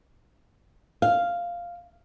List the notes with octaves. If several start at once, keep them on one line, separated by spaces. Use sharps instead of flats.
F5